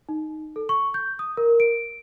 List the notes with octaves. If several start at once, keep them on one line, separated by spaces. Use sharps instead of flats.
D#4
A4
C#6
G6
D#6
A#4
D7